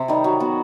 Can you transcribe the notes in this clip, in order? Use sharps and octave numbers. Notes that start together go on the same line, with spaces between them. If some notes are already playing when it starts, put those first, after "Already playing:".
Already playing: C3
D#3 G3
F#3
B3 F#4